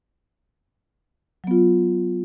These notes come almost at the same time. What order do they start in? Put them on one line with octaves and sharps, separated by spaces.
F#3 B3 F4